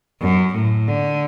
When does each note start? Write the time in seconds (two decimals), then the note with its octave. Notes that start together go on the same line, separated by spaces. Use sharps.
0.21 F#2
0.55 A2
0.88 D3